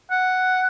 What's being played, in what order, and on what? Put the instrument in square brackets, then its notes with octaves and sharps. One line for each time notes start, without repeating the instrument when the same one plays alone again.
[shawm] F#5